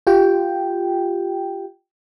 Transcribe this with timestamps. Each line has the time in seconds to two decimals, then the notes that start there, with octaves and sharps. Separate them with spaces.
0.07 F4 G4 G5